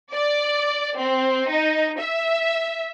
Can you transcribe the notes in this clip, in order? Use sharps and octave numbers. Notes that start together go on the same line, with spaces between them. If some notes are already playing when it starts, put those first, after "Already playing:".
D5
C4
D#4
E5